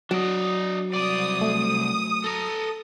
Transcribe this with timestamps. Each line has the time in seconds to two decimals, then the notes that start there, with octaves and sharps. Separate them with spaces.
0.11 F#3 D4 D#5
0.93 C2 D5 D#6
1.41 A3
2.24 A4 A#5